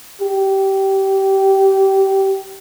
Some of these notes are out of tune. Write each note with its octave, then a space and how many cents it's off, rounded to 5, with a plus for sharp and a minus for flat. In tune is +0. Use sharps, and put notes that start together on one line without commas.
G4 -20